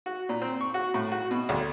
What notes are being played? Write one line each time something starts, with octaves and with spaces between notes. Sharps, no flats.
F#4
A#2
C4
C#6
F#4
A2
F#4
B2
D2